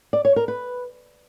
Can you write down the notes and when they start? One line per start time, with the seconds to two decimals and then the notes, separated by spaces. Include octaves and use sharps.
0.13 D5
0.25 C#5
0.36 A#4
0.48 B4